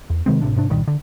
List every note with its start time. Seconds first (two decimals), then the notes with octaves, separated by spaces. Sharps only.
0.10 E2
0.26 C3 D#3 G#3 C4
0.41 G#1 A2 C3 D4
0.56 G#2 C3 D4
0.70 C2 G2 A#2 D#3
0.88 D3